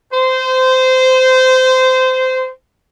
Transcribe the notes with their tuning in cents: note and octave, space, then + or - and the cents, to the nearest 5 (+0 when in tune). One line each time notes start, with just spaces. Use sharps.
C5 -20